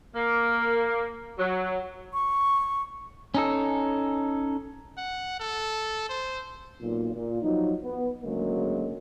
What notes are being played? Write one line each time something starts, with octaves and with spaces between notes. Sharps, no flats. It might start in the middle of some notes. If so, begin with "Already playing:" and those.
A#3
F#3
C#6
C#4 D#4 A4
F#5
A4
C5
B1 A#2
A#2
F3 F#3 D#4
B3
D2 C#3 F#3 G#3 A#3